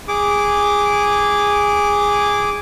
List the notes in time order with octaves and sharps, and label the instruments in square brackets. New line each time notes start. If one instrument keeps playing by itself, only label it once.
[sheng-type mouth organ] G#4 D6